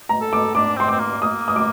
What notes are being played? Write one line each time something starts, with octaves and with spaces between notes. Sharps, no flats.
A#5
A4
D6
D4 D6
C4 C6
C4 D6
A#3
A#3 D#6
D#6
D6